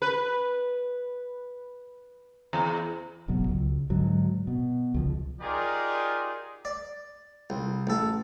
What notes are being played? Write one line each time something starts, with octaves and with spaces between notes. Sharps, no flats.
B4
E2
E1 A1 B2 F#3
C#2
G#2 D3 F#3
B2
C#2 F3
D#4 F4 G4 G#4 A#4 D5
D5
C2
A1 A4